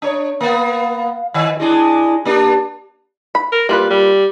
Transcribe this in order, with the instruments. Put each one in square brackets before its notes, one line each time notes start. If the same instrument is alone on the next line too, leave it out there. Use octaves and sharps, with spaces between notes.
[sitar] D4 C#5
[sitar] A#3 B3 [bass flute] F5
[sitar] D#3 [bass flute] D#5
[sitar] G#3 D4 G#4 [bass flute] E4
[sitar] A#3 D4 [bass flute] G4
[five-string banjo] B5
[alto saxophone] A#4
[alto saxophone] G3 [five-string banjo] A#3 F4 B4
[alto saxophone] G3